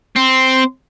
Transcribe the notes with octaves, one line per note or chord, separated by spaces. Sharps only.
C4